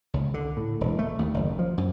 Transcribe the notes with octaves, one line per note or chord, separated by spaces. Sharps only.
C#2
D3
A2
E1
A3
D#2
F#1
F3
F#2